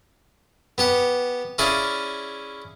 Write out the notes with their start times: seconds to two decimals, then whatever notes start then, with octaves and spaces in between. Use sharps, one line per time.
0.78 B3 G4 F#5
1.58 C#4 E4 G#4 D5 F5